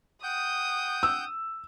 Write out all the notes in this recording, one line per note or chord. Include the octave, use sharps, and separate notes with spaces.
F#5 G5 D#6 G6
E6